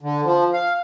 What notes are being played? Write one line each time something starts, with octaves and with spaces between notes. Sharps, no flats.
D3
F3
F5